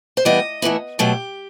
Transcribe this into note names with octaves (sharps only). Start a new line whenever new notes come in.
C5
E3 G3 B3 D#5
A2 E3 B3 E4
B2 F#3 A3 G4